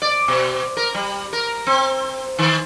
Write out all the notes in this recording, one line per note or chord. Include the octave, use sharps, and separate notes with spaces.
D5
B2
A#4
G3
A#4
C4
D#3